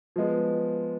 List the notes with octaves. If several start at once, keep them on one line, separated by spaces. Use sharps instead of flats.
F3 G#3 B3